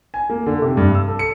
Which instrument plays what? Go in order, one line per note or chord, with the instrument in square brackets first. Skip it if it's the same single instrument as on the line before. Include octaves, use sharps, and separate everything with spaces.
[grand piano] G#5
A#3
D3
C3
G2
E6
A4
C#7